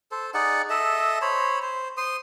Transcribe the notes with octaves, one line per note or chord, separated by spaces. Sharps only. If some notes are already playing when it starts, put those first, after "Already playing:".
A4 C5
D#4 G#4 D5 F#5
A4 D#5 E5
C5 C#5 B5
C5
C5 C6 D#6